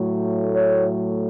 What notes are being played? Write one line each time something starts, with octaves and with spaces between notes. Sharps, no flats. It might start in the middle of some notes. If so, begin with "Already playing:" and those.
Already playing: A2 F#3 A3
C#5